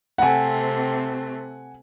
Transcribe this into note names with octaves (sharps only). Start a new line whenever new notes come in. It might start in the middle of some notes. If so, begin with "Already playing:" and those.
C3 A3 C4 F#5 G#5